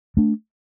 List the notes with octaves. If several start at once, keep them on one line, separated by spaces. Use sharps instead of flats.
A3 D4